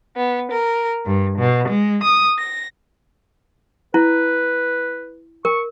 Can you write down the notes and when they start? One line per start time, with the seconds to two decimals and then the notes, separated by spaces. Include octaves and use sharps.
0.17 B3
0.51 A#4
1.06 G2
1.38 B2
1.68 G#3
2.03 D#6
2.38 A#6
3.94 E4 B4
5.45 A#4 C#6